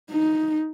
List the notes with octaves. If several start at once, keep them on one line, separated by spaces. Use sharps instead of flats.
D#4